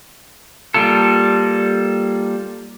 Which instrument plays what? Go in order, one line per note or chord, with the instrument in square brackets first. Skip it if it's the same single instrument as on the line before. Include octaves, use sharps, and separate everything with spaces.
[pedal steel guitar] G3 A#3 F4 A4